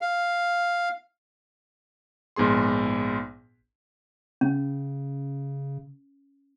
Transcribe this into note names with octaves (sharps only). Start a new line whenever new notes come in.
F5
A#1 G#2 B3 G#4 C6
C#3 C#4